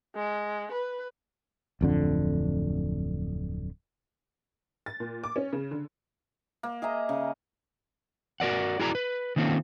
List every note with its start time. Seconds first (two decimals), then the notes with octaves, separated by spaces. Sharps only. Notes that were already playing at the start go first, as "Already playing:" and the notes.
0.16 G#3
0.72 B4
1.81 D1 F2 D3
4.86 A6
5.00 A#2
5.24 D6
5.36 C#4
5.53 C#3
5.71 D3
6.63 A#3
6.82 G#4 D#5 E5 A#5
7.09 C#3
8.40 F#4 A#4 D5 F#5
8.80 E4 F#4 G#4 A#4 D5 A#5
8.95 B4
9.36 D#3 A#3 C4 C#4 F4 A4